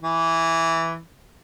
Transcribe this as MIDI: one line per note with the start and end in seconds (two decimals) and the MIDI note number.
0.02 1.00 52